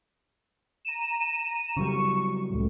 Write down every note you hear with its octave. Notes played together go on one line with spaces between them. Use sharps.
A#5 D#7 E7
C#3 F#3 G3 C#6
C#2 A2